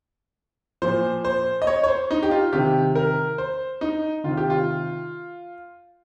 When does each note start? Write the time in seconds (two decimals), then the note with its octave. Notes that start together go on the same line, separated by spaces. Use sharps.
0.82 A#2 F3 C5
1.25 C5
1.62 D#5
1.67 C#5
1.84 C#5
1.88 C5
2.11 D#4
2.23 G4
2.31 F4
2.53 C3 D#3 G4
2.95 A#4
3.38 C5
3.81 D#4
4.24 C3 D#3 F4
4.37 G4
4.50 F4